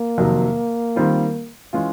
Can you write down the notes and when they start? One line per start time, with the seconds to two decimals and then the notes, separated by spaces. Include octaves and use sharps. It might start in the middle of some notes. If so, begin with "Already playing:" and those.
Already playing: A#3
0.18 F2 C3 D#3 F#3
0.96 D#3 G3 C4 F4
1.73 E3 G#3 C#4 F4